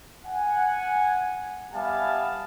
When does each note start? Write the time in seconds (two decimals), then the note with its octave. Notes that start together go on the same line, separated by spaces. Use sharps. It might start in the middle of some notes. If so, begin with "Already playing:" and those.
0.26 F#5 G#5
1.73 G3 B3 E5 F5 G#5 A5